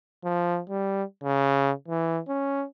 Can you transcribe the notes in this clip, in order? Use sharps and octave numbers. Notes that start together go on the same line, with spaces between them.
F3
G3
C#3
E3
C#4